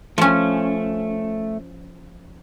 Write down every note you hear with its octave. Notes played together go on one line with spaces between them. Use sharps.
F3 A3 C#4